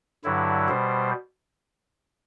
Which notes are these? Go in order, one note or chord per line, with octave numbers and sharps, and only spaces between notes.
G2 D3 F#3 E4
B2 G3 C5